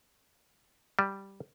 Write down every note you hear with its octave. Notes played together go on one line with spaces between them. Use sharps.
G3